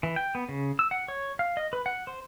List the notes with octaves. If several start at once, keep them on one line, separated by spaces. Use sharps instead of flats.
E3
G5
B3
C#3
E6
F#5
C#5
F5
D#5
B4
F#5
C5